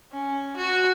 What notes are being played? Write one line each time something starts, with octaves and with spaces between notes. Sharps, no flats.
C#4
F#4